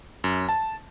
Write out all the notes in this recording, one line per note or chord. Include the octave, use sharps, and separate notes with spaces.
F#2
A5